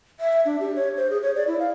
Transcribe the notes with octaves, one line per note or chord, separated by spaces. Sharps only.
E5
D4
G4
C#5
C5
G#4
C#5
D5
E4
F5